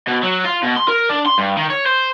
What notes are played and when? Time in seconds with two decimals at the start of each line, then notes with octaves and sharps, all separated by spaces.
0.07 B2
0.23 F#3
0.44 F4
0.63 B2
0.76 C6
0.88 A#4
1.10 D4
1.26 C6
1.38 G2
1.57 D#3
1.70 C#5
1.86 C5